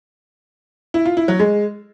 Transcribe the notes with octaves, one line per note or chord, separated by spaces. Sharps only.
E4
F4
E4
F#3
G#3